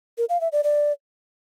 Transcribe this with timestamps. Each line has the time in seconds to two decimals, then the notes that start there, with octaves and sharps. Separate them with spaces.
0.18 A#4
0.29 F5
0.41 E5
0.52 D5
0.64 D5